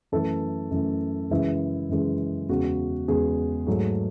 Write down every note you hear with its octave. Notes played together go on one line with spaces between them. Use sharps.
F#2 E3 A3 A4
F#2 E3 A3
F#2 C#3 E3 G#3 E4
F#2 C#3 E3 G#3
E2 C#3 G#3 F#4
E2 C#3 G#3 G#4
G#2 F#3 A3